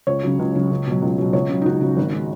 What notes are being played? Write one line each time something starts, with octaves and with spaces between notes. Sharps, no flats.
C#2 C#5
C#3 F#3
C#2
C#3 F#3
C#2
B2 F#3
C#2
B2 F#3
C#2 C#5
C#3 F#3
D#4
C#2 F#4
C#3 F#3
G#1
G#3